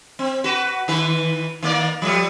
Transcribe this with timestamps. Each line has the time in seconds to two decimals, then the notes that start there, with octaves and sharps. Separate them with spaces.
0.19 C4
0.44 F#4 B4
0.88 D#3 E3 B4
1.63 D#3 A#3 D5
2.02 F3 G3 A3